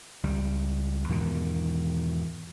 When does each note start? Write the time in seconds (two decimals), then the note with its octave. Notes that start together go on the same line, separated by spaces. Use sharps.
0.23 C#2 G3
1.09 E2 G#2 B2 D#3